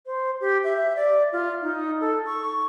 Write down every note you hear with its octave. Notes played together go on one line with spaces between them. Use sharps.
C5
G4
E5
D5
F4
D#4
A4
C#6